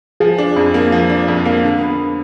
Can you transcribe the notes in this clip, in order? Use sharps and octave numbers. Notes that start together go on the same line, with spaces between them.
F3 G#4
D4
F2
A#3
F3
D4
F2
A#3
D3
B3